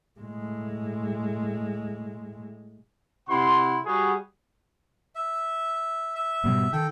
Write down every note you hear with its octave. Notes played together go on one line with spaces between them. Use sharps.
A2 G#3
C3 E4 F#5 C6
G3 F#4 G#4
E5
E5
G#2 B2 G3
D#3 A4 G5